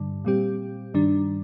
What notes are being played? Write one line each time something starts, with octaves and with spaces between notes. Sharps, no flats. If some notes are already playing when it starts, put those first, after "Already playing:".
Already playing: G2 D3 G3
A#2 G3 C4 G4
G2 D#3 G3 D4